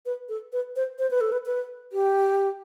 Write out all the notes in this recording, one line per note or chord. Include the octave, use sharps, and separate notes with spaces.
B4
A4
B4
C5
C5
B4
A4
B4
B4
G4